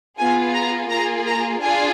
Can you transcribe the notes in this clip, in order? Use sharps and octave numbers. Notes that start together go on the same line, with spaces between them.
B3 F4 G#4 G#5
A#5
A#3 F4 G#4 A#5
A#5
D4 F4 G#4 G#5